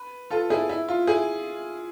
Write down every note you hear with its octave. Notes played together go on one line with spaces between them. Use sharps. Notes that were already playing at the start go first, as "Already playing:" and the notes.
Already playing: B4
F4 A4
E4 G#4
E4
F4
E4 G#4